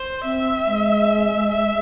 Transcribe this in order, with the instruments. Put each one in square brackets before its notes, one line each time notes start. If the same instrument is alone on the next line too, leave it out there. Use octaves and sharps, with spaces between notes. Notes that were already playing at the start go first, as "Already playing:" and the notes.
Already playing: [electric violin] C5
[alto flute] C4 [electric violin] E5
[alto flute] G#3
[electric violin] E5